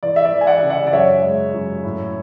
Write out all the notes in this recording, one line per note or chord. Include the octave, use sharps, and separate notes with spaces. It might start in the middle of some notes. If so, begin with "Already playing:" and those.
E3 D5
E5
D5
E3
G#5
D5 F#5
C#3
D5 F#5
D5
F#2 C#5 E5
G#3
F#2
A2